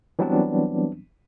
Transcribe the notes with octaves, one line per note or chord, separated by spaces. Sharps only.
E3 F#3 G3 B3 C4 D4